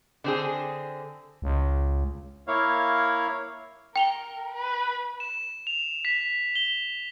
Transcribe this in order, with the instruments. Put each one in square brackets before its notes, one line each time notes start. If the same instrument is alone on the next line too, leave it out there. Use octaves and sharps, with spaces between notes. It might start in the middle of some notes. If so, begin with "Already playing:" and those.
[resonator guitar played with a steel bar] D3 C4 G#4
[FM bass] C#2
[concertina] A#3 E4 C#5 F5
[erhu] A#4 [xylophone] G5 F7 G7
[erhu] B4
[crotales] E7
F7
B6
G7